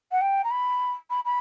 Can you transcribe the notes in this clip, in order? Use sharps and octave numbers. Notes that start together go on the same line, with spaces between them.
F#5
G5
A#5
B5
B5
B5